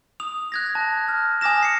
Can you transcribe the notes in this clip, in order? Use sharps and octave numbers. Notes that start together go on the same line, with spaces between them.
D#6 F7
F#6 G#6 A#6
A5
F6
G#5 D6 D#6 A#6 E7
C7 C#7